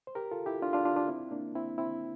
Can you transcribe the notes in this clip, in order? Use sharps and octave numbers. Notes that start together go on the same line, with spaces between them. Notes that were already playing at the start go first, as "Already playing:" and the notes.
C5
G4 A#4
F4 A4
E4 G4
D4 F4
D4 F4
D4 F4
D4 F4
C4 E4
A#3 D4
C4 E4
C4 E4